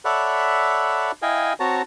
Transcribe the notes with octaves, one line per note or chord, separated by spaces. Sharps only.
A4 C#5 D5 E5 F#5 B5
E4 D#5 F5 G5 G#5
C4 F#4 C#5 A5 A#5